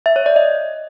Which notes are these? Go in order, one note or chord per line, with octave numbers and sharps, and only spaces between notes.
E5
C#5
D5
D#5